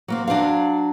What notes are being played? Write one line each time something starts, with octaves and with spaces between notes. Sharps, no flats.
F#3 A#3 C4
F#3 D4 C5 F5